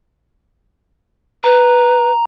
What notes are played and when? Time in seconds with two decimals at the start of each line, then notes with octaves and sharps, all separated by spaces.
1.44 B4 A#5